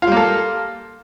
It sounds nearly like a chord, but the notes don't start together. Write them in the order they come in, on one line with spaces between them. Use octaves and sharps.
F4 G3 A#3 A4